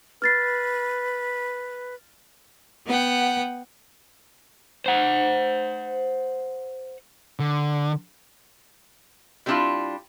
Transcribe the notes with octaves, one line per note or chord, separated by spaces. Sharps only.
B4 F6 A6 C7
B3 F#5 G5
C5 F#5
D3
B2 G3 C4 D4 E4 F4